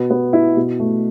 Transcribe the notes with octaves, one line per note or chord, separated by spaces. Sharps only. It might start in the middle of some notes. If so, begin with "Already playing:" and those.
Already playing: B2 B3
B3
E4
B2
A3